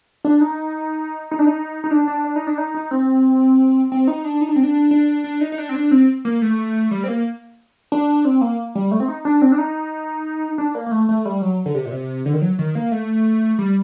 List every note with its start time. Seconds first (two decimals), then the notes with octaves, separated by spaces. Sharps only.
0.25 D4
0.41 D#4
1.31 D#4
1.39 D4
1.47 D#4
1.84 D#4
1.91 D4
2.08 D4
2.24 D4
2.36 D#4
2.47 D4
2.58 D#4
2.75 D#4
2.91 C4
3.92 C4
4.08 D#4
4.25 D4
4.41 D#4
4.49 D4
4.56 C4
4.63 D4
4.91 D4
5.24 D4
5.41 D#4
5.52 D#4
5.58 D4
5.69 C4
5.75 D4
5.91 C4
6.25 A#3
6.42 A3
6.91 G3
7.04 C4
7.08 A#3
7.92 D4
8.25 C4
8.41 A#3
8.75 G3
8.91 A3
9.00 C4
9.08 D#4
9.25 D4
9.42 C4
9.52 D4
9.58 D#4
10.58 D4
10.75 A#3
10.86 A#3
10.91 A3
11.09 A3
11.25 G3
11.42 F#3
11.66 D3
11.75 C3
11.86 A#2
11.92 C3
12.25 D3
12.34 D#3
12.42 F#3
12.59 D#3
12.75 A#3
12.92 A3
13.59 G3